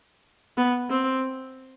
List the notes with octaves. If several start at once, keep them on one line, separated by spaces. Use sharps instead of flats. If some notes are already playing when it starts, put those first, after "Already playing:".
B3
C4